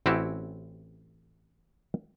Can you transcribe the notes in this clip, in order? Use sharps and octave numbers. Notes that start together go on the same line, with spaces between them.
A1 C4 C#4 E4 F#4 G4